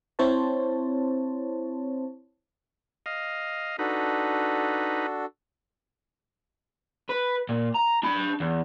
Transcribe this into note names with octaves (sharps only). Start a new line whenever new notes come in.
C4 E4 C5 C#5 A5
D#5 F5
D4 D#4 F#4 A4 B4
B4
A#2
A#5
D4 B5
E2